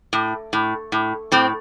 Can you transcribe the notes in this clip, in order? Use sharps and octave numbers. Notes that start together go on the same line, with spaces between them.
A2
A2
A2
A2 C4